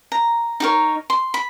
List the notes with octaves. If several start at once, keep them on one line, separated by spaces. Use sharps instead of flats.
A#5
D#4 G4 A#4 C#5
C6
B5